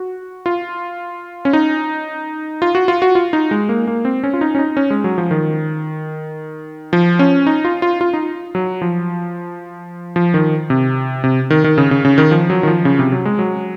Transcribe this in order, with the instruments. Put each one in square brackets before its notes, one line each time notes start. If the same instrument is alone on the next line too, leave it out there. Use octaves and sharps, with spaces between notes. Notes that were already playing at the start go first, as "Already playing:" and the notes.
Already playing: [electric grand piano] F#4
F4
C#4
D#4
F4
F#4
F4
F#4
F4
D#4
G#3
A#3
A#3
C4
C#4
F4
D#4
C#4
D#4
C#4
G#3
F#3
F3
D#3
F3
C#4
D#4
F4
F4
F4
D#4
F#3
F3
F3
D#3
C3
C3
D#3
D#3
C#3
C#3
C#3
D#3
F3
F#3
D#3
F3
C#3
C3
F#3
G#3
F#3